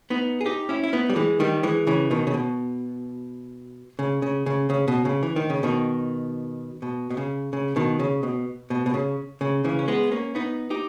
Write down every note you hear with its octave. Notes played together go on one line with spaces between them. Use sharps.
B3 D#4
G#4
D#4 G4
C#4 E4
E4
B3 D#4
G3
E3 G#3
D#3 G3
E3 G#3
C#3 E3
B2 D#3
C#3
B2
C#3
C#3
C#3
C#3
B2
C#3
E3
D#3
C#3
B2 D#3
B2
B2
C#3
C#3
B2 D#3
C#3
B2
B2
B2
C#3
C#3
C#3 E3
C#4
G#3 B3
A#3 C#4
B3 D#4
D#4 G4